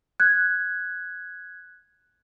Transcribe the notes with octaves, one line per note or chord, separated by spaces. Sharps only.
F#6 G#6